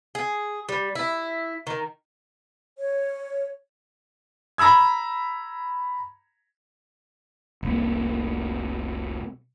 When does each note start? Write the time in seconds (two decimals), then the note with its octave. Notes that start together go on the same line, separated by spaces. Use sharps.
0.15 G#4
0.69 G3
0.95 E4
1.67 D#3
2.78 C#5
4.58 A#5 B5 E6 G#6
7.63 F1 C2 A#3